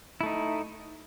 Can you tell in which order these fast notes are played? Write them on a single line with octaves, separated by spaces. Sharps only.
E4 A3 D#4